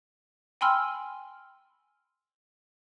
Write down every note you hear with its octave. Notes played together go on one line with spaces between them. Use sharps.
G5 G#5 B5 C6 E6 F6